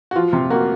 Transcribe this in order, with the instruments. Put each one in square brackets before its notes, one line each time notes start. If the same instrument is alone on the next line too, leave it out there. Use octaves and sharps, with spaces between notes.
[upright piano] F#4
[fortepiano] F3 [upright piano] F4
[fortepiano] C3
[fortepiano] A#3 [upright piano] F#4